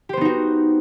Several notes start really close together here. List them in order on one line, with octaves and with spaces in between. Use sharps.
G4 C5 B3 D#4 F#4